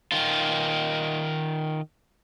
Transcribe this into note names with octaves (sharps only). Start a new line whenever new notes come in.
D#3 F4